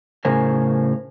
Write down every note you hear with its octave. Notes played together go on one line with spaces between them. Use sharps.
A2 C#3 A#4 C5 G#5